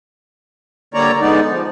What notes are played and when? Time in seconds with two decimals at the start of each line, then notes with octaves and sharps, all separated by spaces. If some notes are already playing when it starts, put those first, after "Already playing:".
0.94 D3 G3 A#3 C#5 D5 A#5
1.20 D3 G#3 B3 D#4 D5
1.49 F3